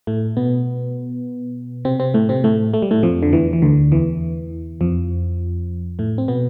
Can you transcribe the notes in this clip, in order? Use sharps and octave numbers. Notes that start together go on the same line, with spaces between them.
A2 A3
B2 B3
C3 C4
C3 C4
A2 A3
C3 C4
A2 A3
A3
G3
A2 A3
F2 F3
D3
E2 E3
E3
D2 D3
E2 E3
F2 F3
A2 A3
C4
B2 B3